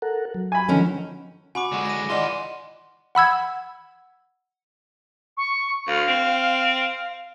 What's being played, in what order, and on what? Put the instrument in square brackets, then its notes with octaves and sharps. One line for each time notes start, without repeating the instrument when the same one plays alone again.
[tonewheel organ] A4 A#4 F#5
F#3
[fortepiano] G#5 B5
[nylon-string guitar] D3 D#3 C#4 [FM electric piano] F3
[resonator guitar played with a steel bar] F#4 [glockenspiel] G#5 B5 D6
[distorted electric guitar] D3 G#3
[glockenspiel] A#6 D#7
[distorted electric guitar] D#3 C6 [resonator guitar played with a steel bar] E3 F4 [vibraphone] D5 D#5 F#5
[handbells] F#5 B5 E6 G#6
[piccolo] C#6
[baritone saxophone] D2 [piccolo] F5
[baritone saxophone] C4